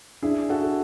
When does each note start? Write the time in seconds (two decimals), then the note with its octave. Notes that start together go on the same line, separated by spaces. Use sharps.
0.22 D4 E4 G#4
0.49 F#4 A4
0.63 G#4